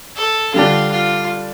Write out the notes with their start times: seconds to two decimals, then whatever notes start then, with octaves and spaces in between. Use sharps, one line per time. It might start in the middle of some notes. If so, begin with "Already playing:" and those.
0.16 A4
0.54 D3 G3 D4 F4
0.92 F4